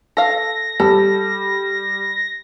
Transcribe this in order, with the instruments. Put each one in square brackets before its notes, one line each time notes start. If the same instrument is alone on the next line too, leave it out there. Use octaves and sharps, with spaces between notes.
[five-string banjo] A4 F5 [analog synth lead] A#6
[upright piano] G3 [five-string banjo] A4